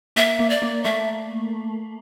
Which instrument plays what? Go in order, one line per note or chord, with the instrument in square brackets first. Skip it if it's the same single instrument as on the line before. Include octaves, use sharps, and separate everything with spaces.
[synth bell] A#3 [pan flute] E5
[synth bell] A#3
[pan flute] D5
[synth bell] A#3
[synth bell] A3 [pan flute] E5